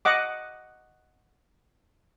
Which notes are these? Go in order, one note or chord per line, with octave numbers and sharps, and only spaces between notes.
D#5 F#5 D6